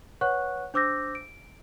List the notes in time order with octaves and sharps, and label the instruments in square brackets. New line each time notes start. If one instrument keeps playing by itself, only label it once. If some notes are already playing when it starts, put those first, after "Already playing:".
[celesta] B4 C#5 F#5 C#6 F#6
D4 C5 D6 E6 G6 A#6
D7